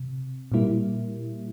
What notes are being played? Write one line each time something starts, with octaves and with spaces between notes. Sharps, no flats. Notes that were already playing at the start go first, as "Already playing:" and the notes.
Already playing: C3
A#2 G3 A#3 E4